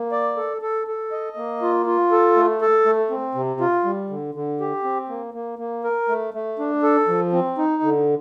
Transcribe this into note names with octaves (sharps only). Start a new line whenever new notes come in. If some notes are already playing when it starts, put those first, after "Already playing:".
Already playing: A#3
D5
A4
A4
A4
D#5
A#3
F4
F4
A4
A3
A4
A3
C4
C3
F4
G3
D3
D3
G4
C4
A#3
A#3
A#3
A#4
A3
A3
D4
A4
F3
C4
D#4
D3